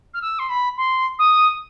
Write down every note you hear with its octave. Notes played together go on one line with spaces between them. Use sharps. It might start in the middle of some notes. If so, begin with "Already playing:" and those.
F6
E6
C6
B5
C6
D#6